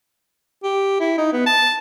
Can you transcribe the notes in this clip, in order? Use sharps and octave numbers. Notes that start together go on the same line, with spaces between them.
G4
E4
D#4
B3
A5